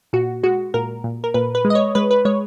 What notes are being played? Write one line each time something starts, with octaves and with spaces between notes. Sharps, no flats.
A#2 F#4
G#3 F#4
A#2 A#4
A#2
A#4
A#2 B4
B4
G#3
D#5
C#5
G#3 B4
B4
G#3 C#5